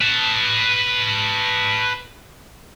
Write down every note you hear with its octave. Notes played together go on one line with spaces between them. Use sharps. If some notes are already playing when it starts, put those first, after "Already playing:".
B4 A5